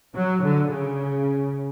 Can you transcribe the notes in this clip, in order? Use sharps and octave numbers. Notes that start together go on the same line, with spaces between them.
F#3
D3
C#3